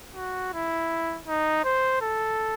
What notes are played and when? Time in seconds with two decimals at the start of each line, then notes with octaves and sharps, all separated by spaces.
0.16 F#4
0.53 E4
1.27 D#4
1.65 C5
2.01 A4